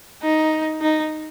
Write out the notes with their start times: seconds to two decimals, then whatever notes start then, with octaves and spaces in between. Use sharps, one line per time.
0.22 D#4
0.81 D#4